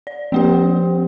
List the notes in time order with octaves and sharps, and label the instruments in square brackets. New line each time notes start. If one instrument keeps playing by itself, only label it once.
[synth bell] D5
[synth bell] F3 A#3 G4 [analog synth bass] C4